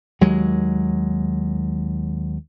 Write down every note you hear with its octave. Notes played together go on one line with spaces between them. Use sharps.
D#2 F#3 G#3